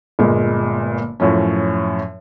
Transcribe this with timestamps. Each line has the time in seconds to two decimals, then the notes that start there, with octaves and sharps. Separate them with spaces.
0.19 G1 A#2 G#3
1.20 F#2 A2 F3 C#4